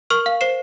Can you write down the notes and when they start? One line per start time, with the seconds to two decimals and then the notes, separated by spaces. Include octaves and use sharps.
0.10 A#4 C#6 F6
0.26 F5
0.41 C5 C7 E7